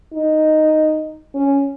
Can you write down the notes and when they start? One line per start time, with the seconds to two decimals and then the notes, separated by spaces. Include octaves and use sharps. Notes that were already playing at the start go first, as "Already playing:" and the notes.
0.13 D#4
1.35 C#4